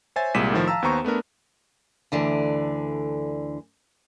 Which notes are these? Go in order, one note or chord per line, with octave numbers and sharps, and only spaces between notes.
C5 C#5 E5 G#5 A6
C2 A#2 G#3 B6 D#7 E7
A2 D#3 F3
F5 A5 A#5 E6
D#2 B3 C5 A#5 C#6
A3 B3 D4 A#4
D2 D3 E3 D5